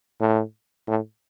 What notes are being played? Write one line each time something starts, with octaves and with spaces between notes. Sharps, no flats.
A2
A2